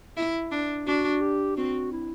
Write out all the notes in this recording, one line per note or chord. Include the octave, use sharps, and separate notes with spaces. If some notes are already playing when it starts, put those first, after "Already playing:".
E4
D4
D4 F#4
G4
C4 F#4
E4